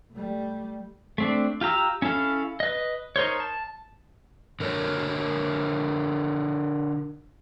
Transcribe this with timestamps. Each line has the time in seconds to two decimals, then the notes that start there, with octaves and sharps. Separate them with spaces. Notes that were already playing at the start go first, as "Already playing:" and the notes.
0.11 G3 A3
1.18 A3 C4 D4
1.61 F4 G4 A#5 E6
2.02 C#4 E4 A4 F5
2.60 B4 D#5
3.16 D#4 A#4 C5 C#5
3.40 A5
4.60 D3 A#4 C#5